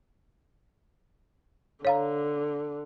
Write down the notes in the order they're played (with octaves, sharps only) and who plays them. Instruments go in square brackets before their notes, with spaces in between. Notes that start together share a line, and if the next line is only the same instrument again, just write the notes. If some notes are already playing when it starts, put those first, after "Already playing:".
[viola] D3 [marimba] C#5 F5 A#5